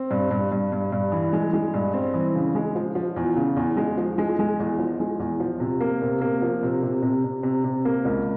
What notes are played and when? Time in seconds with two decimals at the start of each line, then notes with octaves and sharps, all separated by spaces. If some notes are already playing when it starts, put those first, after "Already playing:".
Already playing: C4
0.11 G2
0.31 G2
0.52 G2
0.72 G2
0.92 G2
1.12 E3
1.33 G#3
1.53 G#3
1.74 G2
1.94 C4
2.14 E3
2.35 C#3
2.55 G#3
2.75 F3
2.95 F3
3.16 E2
3.36 C#3
3.56 E2
3.77 G#3
3.97 F3
4.18 G#3
4.39 G#3
4.59 E2
4.79 F3
5.00 G#3
5.19 E2
5.40 F3
5.60 C3
5.80 A#3
6.02 C3
6.21 A#3
6.42 F3
6.63 C3
6.83 C3
7.03 C3
7.24 C3
7.43 C3
7.64 C3
7.85 A#3
8.05 C#2